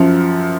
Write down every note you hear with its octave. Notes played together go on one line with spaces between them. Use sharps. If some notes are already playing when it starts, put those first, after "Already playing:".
Already playing: F#2 F3